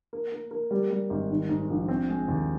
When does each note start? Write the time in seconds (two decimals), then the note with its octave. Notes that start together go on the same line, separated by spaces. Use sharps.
0.13 A#3
0.32 A#3
0.51 A#3
0.71 G3
0.90 G3
1.10 G#1
1.30 D#3
1.49 G#2
1.69 A#1
1.88 C4
2.08 G#3
2.28 D#2